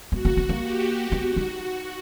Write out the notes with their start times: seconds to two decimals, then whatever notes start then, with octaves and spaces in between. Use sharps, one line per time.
0.12 B3 F#4
0.25 A#3
0.37 B3
0.49 A#3
0.62 G4
1.11 B3 F#4
1.36 D#4